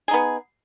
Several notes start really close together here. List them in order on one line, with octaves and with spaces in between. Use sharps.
G#4 D#4 B3